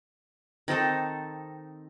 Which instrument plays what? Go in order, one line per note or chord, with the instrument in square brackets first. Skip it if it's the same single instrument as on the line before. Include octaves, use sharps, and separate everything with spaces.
[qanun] D#3 C4 D#4 A4